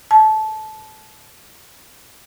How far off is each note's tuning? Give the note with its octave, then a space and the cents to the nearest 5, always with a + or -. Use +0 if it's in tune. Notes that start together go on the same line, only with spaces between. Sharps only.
A5 -20